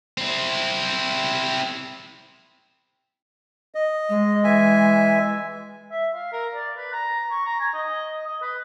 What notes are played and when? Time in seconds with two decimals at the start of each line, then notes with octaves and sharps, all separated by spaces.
0.18 C4 E4
3.75 D#5
4.09 G#3
4.44 E3 E5 G#5
5.91 E5
6.14 F5
6.32 A#4
6.54 D5
6.77 B4
6.93 A#5
7.31 C#6
7.45 A#5
7.60 G#5
7.74 D#5
8.27 D#5
8.42 B4